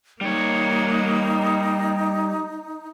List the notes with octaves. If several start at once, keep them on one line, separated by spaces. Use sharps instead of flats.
G3 A#3 D#4 C#5